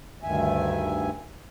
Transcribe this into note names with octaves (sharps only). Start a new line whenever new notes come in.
D2 G2 D#3 E5 G#5